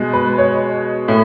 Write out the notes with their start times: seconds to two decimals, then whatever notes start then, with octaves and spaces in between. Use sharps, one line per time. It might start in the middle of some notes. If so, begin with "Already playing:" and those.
Already playing: B2 G#3
0.13 B4
0.38 C#5
1.08 A2